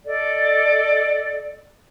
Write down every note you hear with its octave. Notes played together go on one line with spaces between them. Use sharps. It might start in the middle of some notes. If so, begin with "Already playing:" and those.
A4 D5 D#5